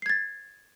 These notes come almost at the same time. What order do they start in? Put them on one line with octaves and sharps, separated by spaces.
C7 G#6 A6